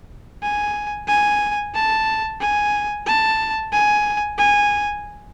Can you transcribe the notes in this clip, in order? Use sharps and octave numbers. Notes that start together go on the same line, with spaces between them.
G#5
G#5
A5
G#5
A5
G#5
G#5